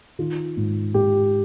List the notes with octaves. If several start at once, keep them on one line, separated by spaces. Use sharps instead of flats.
D#3 F4
G#2
G#2 G4